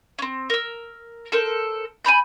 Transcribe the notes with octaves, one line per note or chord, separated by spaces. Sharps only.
C4 C#4
A#4 E6
A4 A#4 C5
G#5 A#5 B5 G6